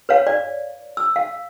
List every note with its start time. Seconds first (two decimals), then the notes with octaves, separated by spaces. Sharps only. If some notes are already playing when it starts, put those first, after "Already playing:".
0.09 B4 C#5 F5
0.27 D5
0.97 E6
1.16 F5